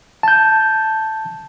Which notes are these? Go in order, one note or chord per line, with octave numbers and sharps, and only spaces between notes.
A5 G6